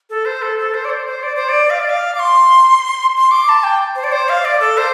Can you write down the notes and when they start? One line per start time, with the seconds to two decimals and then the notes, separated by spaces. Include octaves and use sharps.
0.10 A4
0.25 C5
0.42 A4
0.58 A4
0.74 C5
0.85 D5
0.90 C5
1.07 C5
1.23 D5
1.36 C5
1.49 D5
1.70 F5
1.80 D5
1.89 F5
2.15 D6
2.19 C6
3.16 C6
3.31 D6
3.48 A5
3.63 G5
3.96 C5
4.04 D5
4.12 C5
4.29 F5
4.45 D5
4.60 A4
4.77 C5